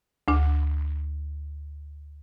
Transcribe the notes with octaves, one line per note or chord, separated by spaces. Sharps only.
D2 D4